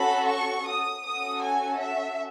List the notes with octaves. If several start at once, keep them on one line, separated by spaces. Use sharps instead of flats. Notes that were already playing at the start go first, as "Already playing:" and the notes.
Already playing: C#4 F#4 A4 B5
C#6
D#6
C#4 F#4 A4 D#6
G#5
E5